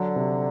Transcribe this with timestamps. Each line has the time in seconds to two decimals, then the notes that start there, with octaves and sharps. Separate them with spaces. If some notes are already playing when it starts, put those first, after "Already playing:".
Already playing: D3 F#3
0.16 C3